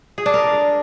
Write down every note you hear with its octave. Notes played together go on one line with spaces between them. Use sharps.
G#4
D4
A#4